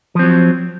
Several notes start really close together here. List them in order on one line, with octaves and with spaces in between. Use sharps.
F3 C4 F#3